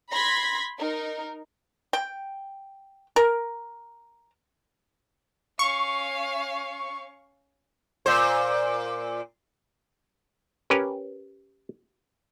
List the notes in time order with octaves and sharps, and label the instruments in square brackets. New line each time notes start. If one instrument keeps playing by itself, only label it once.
[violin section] B5 C6 G#6 A#6 B6
D#4 A#4
[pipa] G5
A#4
[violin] C#4 F5 [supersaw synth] C#6
[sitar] A#2 C5
[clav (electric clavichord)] C#4 G4 A#4 B4